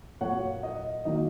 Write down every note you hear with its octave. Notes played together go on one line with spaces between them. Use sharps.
A#2 F#3 A#3 C#5 F#5
D#5
D#3 F#3 A#3 D#5